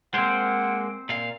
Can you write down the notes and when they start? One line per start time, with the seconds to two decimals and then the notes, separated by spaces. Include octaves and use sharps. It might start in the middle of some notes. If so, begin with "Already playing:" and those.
0.14 G#3 A#3 C4 C5 F#5
1.09 A#2 F5